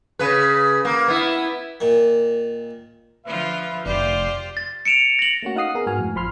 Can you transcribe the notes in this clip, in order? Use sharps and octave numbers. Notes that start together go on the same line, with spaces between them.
C#3 B4
A#3
B3 E4
A#2 D#3
D3 F3 F4 B4 E5
F1 F4 G4 C5 D5
A6
C#7 D7 E7 F7
A#6 F#7
A3 A#3 C#4 F#4
D#4 F5 F#5 D#6 C7
B3 G#4 A#4
G#2 F#4 G#5 F6
F2 A2
A1 F3 B5 C6 F6